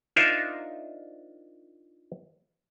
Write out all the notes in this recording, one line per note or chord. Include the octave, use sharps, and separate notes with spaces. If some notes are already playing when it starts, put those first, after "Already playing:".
D4 D#4 F4 A#4 C5 E5